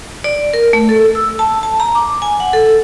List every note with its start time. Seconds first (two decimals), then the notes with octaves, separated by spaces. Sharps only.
0.24 D5
0.53 A#4
0.73 A3
0.89 A4
1.15 E6
1.39 A5
1.63 A5
1.80 A#5
1.95 D6
2.22 G#5
2.40 F#5
2.53 A4